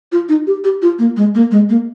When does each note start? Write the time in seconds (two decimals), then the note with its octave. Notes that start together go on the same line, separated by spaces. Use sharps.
0.12 F4
0.29 D#4
0.47 G4
0.64 G4
0.82 F4
0.99 A#3
1.17 G#3
1.35 A#3
1.51 G#3
1.69 A#3